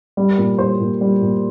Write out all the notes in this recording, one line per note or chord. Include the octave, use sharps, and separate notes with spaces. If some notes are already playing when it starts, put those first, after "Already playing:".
G3
A#2
G3 C5
A#2
G3
A#2